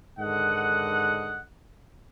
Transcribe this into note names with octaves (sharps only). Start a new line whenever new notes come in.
G#2 D3 D#3 D#5 F#5